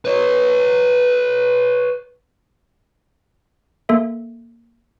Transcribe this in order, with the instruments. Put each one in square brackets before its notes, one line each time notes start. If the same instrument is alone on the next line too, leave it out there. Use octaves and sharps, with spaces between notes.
[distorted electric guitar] B4 C#5
[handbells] A#3 A4 E5